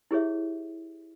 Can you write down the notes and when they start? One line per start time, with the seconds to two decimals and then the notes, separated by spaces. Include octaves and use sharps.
0.11 E4 G4 G#4 C#5 E5